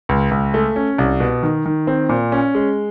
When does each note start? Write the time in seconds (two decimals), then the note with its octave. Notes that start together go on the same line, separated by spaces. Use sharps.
0.09 C#2
0.31 C#2
0.54 A3
0.76 C#4
0.98 C2
1.20 B2
1.43 D#3
1.66 D#3
1.87 C4
2.09 A#2
2.32 C#4
2.55 G#3